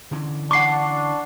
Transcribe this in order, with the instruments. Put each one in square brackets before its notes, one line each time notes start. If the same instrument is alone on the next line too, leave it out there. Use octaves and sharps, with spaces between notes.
[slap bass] D3 E3 C#4
[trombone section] D4 [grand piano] F#5 C#6 [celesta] D6 C7